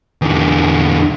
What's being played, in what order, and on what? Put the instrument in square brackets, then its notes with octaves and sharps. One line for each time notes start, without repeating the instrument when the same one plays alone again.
[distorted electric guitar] E2 D3